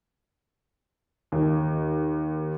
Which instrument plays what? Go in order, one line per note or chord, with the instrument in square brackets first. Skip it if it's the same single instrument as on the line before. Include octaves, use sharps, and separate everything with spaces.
[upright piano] D#2